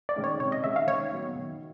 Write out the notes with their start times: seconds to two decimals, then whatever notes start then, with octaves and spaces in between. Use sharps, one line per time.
0.09 D5
0.16 D#3 G#3 C#4
0.24 C#5
0.40 C3 C#5
0.52 D#5
0.64 D#3 G#3 C#4 E5
0.76 F5
0.87 D#3 C#5
1.12 F#3 B3
1.35 D#3